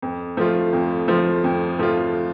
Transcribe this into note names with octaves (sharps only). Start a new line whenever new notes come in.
F2
F3 A3 F4
F2
F3 A3 F4
F2
F3 A3 F4